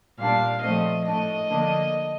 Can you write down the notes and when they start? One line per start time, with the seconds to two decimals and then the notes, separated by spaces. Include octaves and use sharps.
0.19 A#2 G3 A#3 D4 F5
0.62 A#2 F3 A3 C4 D#5
1.06 A2 A3 D4 D#5
1.50 D3 F3 A#3 D4